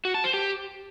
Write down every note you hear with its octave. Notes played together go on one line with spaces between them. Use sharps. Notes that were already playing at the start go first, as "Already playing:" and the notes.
F#4
A5
C5
G4